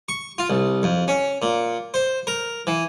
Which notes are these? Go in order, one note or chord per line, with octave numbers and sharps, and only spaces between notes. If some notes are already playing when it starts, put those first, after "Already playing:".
C#6
F4
C2
F2
C#4
A#2
C5
A#4
E3